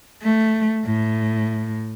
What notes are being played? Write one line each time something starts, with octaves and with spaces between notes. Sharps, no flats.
A3
A2